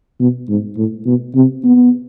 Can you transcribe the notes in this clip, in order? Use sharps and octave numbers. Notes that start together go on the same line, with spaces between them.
B2
G#2
A2
B2
C3
B3